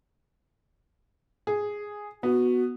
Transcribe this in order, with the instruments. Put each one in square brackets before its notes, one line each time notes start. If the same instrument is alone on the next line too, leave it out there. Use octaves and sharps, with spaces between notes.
[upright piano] G#4
[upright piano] B3 [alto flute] F#4